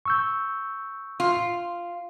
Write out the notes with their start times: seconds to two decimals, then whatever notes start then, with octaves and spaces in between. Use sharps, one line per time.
0.05 C#6 E6 G6
1.20 F4